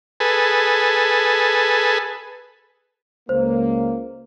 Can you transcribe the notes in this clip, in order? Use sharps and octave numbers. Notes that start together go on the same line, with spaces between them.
G#4 A4 B4
C#2 A#3 C5